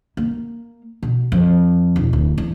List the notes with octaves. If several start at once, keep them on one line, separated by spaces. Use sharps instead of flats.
A#3
B2
F2
E1
D1
E2